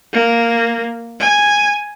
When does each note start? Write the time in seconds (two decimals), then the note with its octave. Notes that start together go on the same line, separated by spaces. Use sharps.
0.13 A#3
1.20 G#5